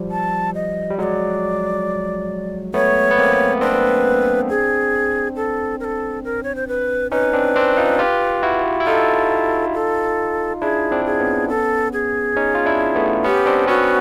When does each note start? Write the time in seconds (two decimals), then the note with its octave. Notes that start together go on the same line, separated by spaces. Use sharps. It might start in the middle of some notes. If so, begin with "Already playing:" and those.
Already playing: F3 G3
0.11 A5
0.55 D#5
0.90 G3
0.98 F#3 G#3 D#5
1.03 D5
2.74 A3 B3 C#5
3.11 B3
3.18 A#3 C4
3.61 C4 D4 B4
4.50 G#4
5.36 A4
5.80 A#4
5.84 A4
6.24 A#4
6.43 C#5
6.55 C5
6.68 B4
7.12 C#4 D#4 B4
7.33 C4 D4
7.56 C4 D4
7.77 D#4 F4
7.99 F4 G4
8.43 E4 F#4
8.80 E4
8.87 D#4 F4 A4
9.74 A4
10.61 D4 E4 G#4
10.91 C4 D4
11.06 G#4
11.20 B3 C#4
11.49 A4
11.93 G#4
12.36 C#4 D#4
12.55 F4
12.66 D4 E4
12.95 A3 B3
13.24 B3 C#4 G4
13.46 C4 D4
13.68 B3 C#4 F#4